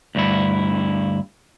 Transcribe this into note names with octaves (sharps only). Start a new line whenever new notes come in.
D2 G2 E4